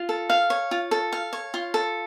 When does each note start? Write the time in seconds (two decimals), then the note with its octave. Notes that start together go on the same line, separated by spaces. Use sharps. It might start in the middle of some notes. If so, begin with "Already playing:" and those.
Already playing: F4
0.09 A4
0.30 F5
0.50 C#5
0.71 F4
0.91 A4
1.12 F5
1.33 C#5
1.54 F4
1.74 A4